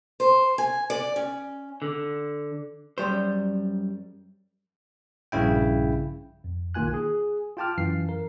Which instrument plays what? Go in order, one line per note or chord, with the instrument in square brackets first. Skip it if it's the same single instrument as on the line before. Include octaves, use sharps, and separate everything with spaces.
[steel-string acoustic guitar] C5
G#5
D5
C#4
[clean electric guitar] D3
[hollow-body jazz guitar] F#2 A#2 G3 C5
[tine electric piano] A#1 G2 C#3 E4 G5
F2
B1 D#3 A#3 F4 G#5 F#6
G#4
F4 F5 G5 A5 D6 F6
F#2 E3 F5 C7
A#4